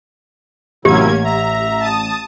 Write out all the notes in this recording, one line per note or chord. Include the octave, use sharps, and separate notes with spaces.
A1 C3 F#3 A#3 C#4 E4 G4 G#6
E5 A#5
A5 D#6